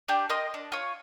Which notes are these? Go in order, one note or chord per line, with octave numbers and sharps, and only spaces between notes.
D4 G4
A#4 D#5 C6 D#6
D4
F4 C#5